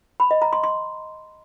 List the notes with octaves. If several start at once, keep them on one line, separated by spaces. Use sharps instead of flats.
B5
D#5
A#5
C6
C6